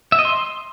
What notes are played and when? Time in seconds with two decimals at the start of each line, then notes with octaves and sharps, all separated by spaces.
0.12 E5
0.19 D#5
0.25 C6